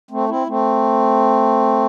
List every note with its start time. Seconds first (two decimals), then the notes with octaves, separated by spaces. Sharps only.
0.11 A3 C4
0.29 C4 E4
0.47 A3 C4